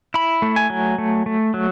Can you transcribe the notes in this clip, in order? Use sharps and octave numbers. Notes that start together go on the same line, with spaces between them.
E4 B5
A3
G#5
F#3
A3
A3
F#3